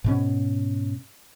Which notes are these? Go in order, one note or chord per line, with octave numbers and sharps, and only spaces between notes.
G#2 B2 C#4